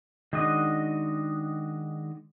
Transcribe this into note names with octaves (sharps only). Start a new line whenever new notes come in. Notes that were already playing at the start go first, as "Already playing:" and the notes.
D#3 G#3 D4 F#4 D#5